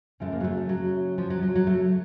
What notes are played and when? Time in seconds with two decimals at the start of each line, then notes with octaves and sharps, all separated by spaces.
0.20 F#2 C#3 F3 A3
0.32 A#3
0.40 F#3
0.44 A3
0.57 A3
0.69 F#3
1.18 F3
1.30 F#3
1.43 F#3
1.55 F#3
1.67 A3